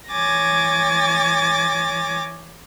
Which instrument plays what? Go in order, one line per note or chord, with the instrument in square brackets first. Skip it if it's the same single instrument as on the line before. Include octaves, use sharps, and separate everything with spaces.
[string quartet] E3 C#5 G#5 D6 A6 A#6